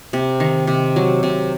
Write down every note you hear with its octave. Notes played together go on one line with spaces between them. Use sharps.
C3
D#3
C3
F#3
C3